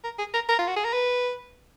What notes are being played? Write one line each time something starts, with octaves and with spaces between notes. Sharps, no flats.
A#4
G#4
A#4
A#4
F4
F#4
G#4
A#4
B4